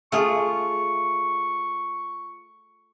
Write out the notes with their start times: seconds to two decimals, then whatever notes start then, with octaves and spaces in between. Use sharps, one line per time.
0.12 A3 F4 G#4 C#6